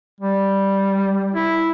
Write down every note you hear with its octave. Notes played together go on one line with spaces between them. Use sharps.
G3
E4